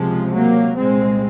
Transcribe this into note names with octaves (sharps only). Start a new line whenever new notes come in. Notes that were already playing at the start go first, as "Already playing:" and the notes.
Already playing: C#2 C3 F3 G#3
F#3 A#3
C2 A#2 G#3 C4